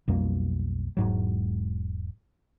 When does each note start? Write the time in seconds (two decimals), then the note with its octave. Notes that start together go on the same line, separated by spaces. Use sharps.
0.08 B1 F2 G3 A#3
0.97 E1 G#2 F#3